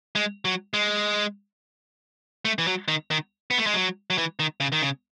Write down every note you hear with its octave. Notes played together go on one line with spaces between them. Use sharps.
G#3
F#3
G#3
A3
E3
F#3
D#3
D#3
B3
A3
G#3
F#3
F#3
E3
D#3
C#3
D#3
C#3